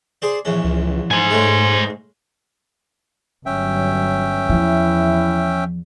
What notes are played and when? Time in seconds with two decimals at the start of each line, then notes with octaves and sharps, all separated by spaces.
0.22 G#4 C5 D5
0.45 A#1 E2 C#4
0.65 C#2
1.11 G#2 C5 G#5
1.30 G#3 A3 C#4
3.46 G1 F#3 C#4 E5 G5
4.50 E2 E3 F3 E4